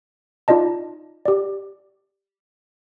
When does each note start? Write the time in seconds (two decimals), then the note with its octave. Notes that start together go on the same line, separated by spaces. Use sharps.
0.48 D#4 F4 D5 D#5 A5
1.25 G4 D5